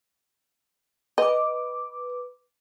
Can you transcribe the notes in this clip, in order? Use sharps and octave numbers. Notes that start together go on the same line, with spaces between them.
B4 D#5 D6